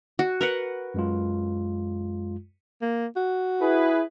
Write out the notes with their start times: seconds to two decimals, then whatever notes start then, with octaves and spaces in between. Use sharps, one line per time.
0.19 F#4
0.41 A#4 B4 F#5
0.94 F#2 G#3 F4
2.82 A#3
3.16 F#4
3.61 E4 G#4 B4